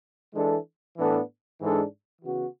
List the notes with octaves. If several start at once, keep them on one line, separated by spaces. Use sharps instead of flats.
E3 G#3 D4 A4
A2 E3 B3 D4 A4
G#2 E3 G#3 D4 A4
C#3 E3 B3 F#4